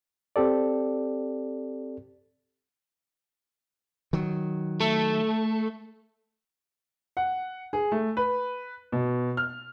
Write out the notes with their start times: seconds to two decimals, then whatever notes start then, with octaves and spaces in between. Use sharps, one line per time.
0.36 C4 G4 A4 D5
4.13 D#3 F#3
4.81 A3 A4
7.17 F#5
7.73 G#4
7.92 A3
8.17 B4
8.92 B2
9.37 F6